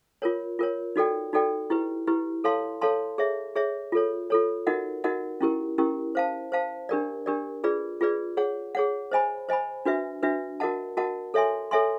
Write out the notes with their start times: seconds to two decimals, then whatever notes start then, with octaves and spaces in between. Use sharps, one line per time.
0.22 F4 A#4 C#5
0.59 F4 A#4 C#5
0.96 D#4 F#4 A4 D5 G5
1.33 D#4 F#4 A4 D5 G5
1.70 E4 G4 B4
2.07 E4 G4 B4
2.44 A4 C#5 F5 A5 C6
2.82 A4 C#5 F5 A5 C6
3.18 G#4 C#5 E5
3.55 G#4 C#5 E5
3.92 F4 A4 C#5
4.30 F4 A4 C#5
4.67 D#4 F#4 A#4 D#5 F#5
5.04 D#4 F#4 A#4 D#5 F#5
5.41 C#4 E4 G4 A#4
5.78 C#4 E4 G4 A#4
6.15 C5 F5 A5
6.52 C5 F5 A5
6.89 D4 G4 A#4 D5
7.26 D4 G4 A#4 D5
7.64 F4 G#4 B4 D5
8.01 F4 G#4 B4 D5
8.37 G#4 C#5 F#5
8.75 G#4 C#5 F#5
9.12 C5 D#5 G#5 B5
9.49 C5 D#5 G#5 B5
9.85 D4 F#4 B4 E5
10.23 D4 F#4 B4 E5
10.60 F#4 A#4 D#5 F#5 A5
10.97 F#4 A#4 D#5 F#5 A5
11.34 A4 C#5 E5 G#5 C6
11.71 A4 C#5 E5 G#5 C6